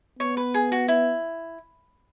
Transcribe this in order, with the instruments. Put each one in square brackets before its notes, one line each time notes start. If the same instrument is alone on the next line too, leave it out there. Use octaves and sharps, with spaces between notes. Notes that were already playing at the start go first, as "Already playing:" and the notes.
[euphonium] B3 [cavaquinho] C#5
[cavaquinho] B4
G#4
F#4
E4